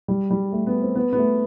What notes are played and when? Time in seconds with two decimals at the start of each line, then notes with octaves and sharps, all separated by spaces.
0.08 G3
0.31 G3
0.52 A3
0.67 B3
0.82 C4
0.95 B3
1.13 B3
1.18 A3